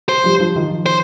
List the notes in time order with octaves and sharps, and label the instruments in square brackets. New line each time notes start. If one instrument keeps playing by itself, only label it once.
[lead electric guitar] C5
[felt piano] F3 G3
F3 G3
D#3 F3
[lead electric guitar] C5